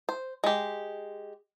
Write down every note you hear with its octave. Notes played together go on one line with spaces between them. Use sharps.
C5
G#3 G4